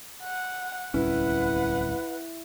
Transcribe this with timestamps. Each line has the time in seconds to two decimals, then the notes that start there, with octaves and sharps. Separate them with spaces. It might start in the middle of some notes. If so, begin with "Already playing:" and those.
0.24 F#5
0.94 D1 C2 C#4 E4 B4 F#5